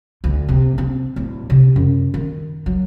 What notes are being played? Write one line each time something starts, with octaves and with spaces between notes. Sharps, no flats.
D2
C3
C4
D1
C3
F#2
D#3
F#3